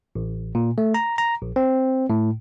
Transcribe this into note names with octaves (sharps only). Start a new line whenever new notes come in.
A1
A#2
A3
A#5
A#5
A#1
C4
A2